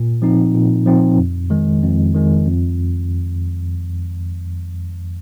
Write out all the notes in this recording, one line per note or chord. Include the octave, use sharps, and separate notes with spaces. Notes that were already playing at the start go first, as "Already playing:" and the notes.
Already playing: A#2
F3 C4 D#4
A#2
F3 C4 D#4
F2
D#3 G#3
F2
D#3 G#3
F2